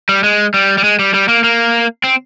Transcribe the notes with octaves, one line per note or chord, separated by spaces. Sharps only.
G3
G#3
G3
G3
G#3
G3
G3
A#3
A#3
C4